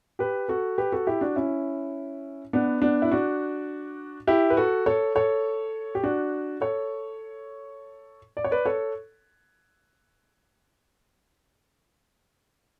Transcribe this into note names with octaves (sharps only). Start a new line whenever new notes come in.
G4 B4
F#4 A4
G4 B4
F#4 A4
E4 G4
D4 F#4
C#4 E4
B3 D4
B3 D4
E4
D4 F#4
E4 G4
B4
F#4 A4
A4 C#5
A4 C#5
G4
D4 F#4
A4 C#5
D5
C#5
B4 D5
A4 C#5